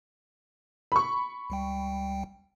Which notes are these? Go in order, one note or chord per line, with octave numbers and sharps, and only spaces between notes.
B5 C#6
C#2 G3 G5